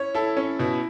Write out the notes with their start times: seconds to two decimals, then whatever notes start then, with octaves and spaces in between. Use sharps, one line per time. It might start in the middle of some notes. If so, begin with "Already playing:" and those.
Already playing: C#4 E4 C#5
0.15 E4 A4
0.37 C#4
0.59 B2 E4